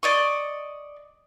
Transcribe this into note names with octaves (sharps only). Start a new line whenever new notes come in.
D5 D#5 C#6